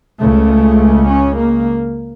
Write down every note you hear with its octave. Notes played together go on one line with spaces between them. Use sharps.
C#2 C#3 A3
C#4
A#3